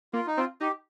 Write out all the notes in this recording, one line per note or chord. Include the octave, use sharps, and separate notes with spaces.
A#3 F4
D#4
C4 F4
D#4 G4